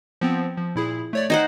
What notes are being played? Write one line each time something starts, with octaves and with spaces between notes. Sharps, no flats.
F3 B3 C4
F3
A#2 E4 G#4
A3 C#5 D5
D#4 C5 F#5 G5 G#6